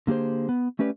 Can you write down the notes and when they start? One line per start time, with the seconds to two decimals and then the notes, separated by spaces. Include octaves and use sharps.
0.07 D3 A#3 G4 G#4 C5
0.49 B3
0.79 A3 C#4 G4 B4 D5